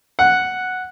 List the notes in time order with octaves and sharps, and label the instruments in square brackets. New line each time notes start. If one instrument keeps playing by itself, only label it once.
[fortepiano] F#5